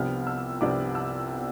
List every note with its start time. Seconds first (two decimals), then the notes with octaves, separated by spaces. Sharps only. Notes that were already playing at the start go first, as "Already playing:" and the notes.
Already playing: C2 C3 F3 B3 D4 F6
0.27 E6
0.61 C2 C3 F3 B3 D4 D6
0.95 E6